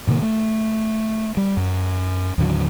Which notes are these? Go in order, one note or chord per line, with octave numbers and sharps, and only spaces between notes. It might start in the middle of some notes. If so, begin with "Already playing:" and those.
A2 C3 D#3 A#3
A3
G3
F#2
D#2 A2 D3 F#3